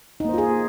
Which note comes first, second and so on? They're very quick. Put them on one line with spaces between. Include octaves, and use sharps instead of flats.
D#4 A#3 C5 F4 G#4